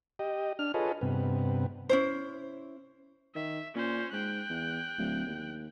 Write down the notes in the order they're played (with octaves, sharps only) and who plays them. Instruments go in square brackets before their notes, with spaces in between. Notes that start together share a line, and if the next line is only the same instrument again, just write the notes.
[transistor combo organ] G4 D#5
D4 F6
F4 G#4 A4 B4 C#5 D#5
G2 C3 B3
[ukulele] C#4 E4 C5
[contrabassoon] D#3 [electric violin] E5
[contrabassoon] A#2 [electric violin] C#4 C5
[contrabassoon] G#2 [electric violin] G5 F#6
[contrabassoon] E2
D1
D#2